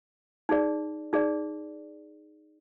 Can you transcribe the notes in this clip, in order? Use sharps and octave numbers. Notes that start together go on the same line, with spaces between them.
D#4 G#4 D5
D#4 G#4 D5